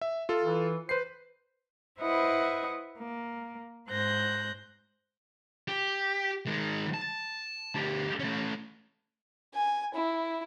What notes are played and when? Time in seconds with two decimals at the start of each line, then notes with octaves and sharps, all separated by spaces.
0.01 E5
0.29 F4 A4
0.43 E3
0.89 B4 C5 C7
2.01 E4 B4 C5 D#5 E5 F#5
2.99 A#3
3.89 G#2 C5 F#6 G6 A#6
5.68 G4
6.46 D#3 G#3
6.94 A5
7.75 D2 G4
8.19 A3 C#4
9.54 G#5
9.94 E4